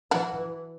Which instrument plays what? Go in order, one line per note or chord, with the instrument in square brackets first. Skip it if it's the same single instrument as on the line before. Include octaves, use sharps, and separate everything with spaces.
[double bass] E3 [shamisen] D4 F#4